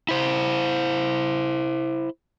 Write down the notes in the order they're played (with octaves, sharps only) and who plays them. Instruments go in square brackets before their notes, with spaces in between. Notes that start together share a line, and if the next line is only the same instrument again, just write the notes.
[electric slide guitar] E4 C5